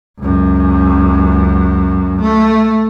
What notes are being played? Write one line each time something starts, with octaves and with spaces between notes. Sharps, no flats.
C#2 F#2
A3